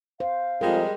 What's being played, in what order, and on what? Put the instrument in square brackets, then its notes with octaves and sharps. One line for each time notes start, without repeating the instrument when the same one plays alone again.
[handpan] C5 [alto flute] F5
[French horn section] F2 [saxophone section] G3 G#3 [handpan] A#4